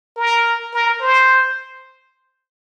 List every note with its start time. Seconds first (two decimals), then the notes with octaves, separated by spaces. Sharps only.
0.17 A#4
0.74 A#4
1.01 C5